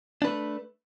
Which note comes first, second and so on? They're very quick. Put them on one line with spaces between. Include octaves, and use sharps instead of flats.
D4 B4 A3